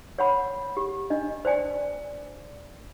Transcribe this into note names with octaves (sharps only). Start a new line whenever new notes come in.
C#5 F#5 B5
G4
D4 D#5
C5 D5 G#5